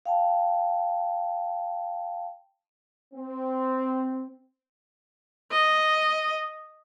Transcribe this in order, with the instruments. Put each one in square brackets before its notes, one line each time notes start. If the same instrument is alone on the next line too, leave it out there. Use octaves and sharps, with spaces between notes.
[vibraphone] F5 G5 A5
[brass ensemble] C4
[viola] D#5